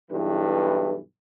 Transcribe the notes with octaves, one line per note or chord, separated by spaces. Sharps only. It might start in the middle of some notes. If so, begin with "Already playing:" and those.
B1 G2 E3